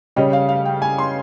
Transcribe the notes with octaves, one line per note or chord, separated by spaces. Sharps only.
C#3 G3 C#4 G4 D#5
F5
F5
G5
G#5
C6